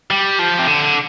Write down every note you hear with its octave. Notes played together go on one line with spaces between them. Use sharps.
G3
F3
C3
D3